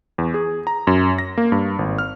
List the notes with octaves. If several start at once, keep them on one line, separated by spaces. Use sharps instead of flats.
E2
G#4
A#5
F#2
A#6
A#3
G2
G#1
F6